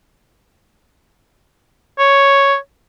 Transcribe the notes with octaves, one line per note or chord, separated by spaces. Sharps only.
C#5